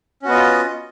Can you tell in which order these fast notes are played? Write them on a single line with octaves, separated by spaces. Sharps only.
C#4 F#4 B3 D#5 F4